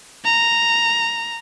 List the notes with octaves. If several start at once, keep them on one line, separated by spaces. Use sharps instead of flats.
A#5